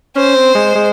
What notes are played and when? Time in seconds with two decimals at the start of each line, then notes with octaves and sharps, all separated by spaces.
0.16 C#4 C5
0.36 C4
0.55 G#3
0.75 G#3